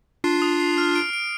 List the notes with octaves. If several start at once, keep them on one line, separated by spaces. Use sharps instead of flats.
D4 F4 C7
D#6
C7
F6
D7
D7